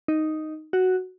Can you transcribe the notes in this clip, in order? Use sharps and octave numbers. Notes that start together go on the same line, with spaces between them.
D#4
F#4